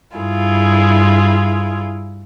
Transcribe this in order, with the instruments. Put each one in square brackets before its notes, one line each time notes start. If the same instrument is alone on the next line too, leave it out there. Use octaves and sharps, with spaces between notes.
[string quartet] G2 E4 F4 G#4